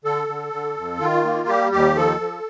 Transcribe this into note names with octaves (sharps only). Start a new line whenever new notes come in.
D3 A4
D3
D3
F2
D#3 F4
A#3
G3 G4
D#2 G4
F3 A4
F3